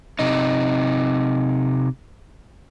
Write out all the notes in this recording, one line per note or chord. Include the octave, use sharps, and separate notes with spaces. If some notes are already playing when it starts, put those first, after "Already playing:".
C3 D#4